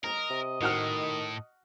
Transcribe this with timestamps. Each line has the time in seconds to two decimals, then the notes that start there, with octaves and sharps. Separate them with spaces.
0.04 A#4 D#5 A#5
0.30 C3
0.61 A2 D#3 F#4 F#5 F6